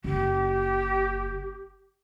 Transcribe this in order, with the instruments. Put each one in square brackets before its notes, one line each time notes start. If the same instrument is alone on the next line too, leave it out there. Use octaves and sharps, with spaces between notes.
[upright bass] F#1 [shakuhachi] G4